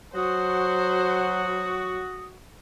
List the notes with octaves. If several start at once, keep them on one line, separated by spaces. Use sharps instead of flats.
F#3 F#4 C5 D#6